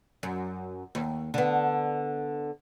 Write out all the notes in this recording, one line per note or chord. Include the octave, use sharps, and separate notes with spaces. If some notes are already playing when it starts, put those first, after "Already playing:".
F#2
D#2
D3 B3